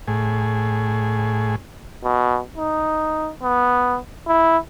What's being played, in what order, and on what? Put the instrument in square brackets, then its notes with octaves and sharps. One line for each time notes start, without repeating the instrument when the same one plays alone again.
[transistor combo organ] A2 G#4
[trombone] B2
D#4
B3
E4